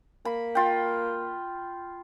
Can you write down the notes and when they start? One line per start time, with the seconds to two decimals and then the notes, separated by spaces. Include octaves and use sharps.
0.25 A#3 B5
0.55 F4 G5